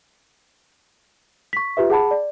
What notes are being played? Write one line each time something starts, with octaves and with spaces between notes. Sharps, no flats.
C#6 B6
F4 G4 B4 E5
G#4 F#5 A5 B5
D5